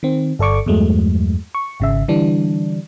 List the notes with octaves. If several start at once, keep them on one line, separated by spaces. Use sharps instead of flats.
D#3 C4
G1 A4 D5 C#6 D6
E2 G2 F#3 G#3 A3
C#6
G#1 C#3 E5
D3 E3 G3 D4